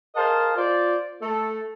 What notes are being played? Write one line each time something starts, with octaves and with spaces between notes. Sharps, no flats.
G#4 A#4 C5 D#5 F5 A5
F4 C5 D5
A3 A4